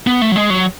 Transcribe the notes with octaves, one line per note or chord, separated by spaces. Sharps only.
B3
A3
F#3
G#3
F#3